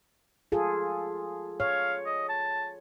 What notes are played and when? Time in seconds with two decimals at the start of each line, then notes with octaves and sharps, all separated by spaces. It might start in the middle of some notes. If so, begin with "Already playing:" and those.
0.52 F4 G#4 A4
1.60 C#5 F5
2.06 D#5
2.29 A5